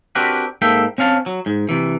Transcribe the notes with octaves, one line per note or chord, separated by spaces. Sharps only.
C4 D4 F#4 G4 A#4 B4
G#2 A#3 A4 E5 G5
C4 C#4 F5 A5
F#3
G#2
C3 E3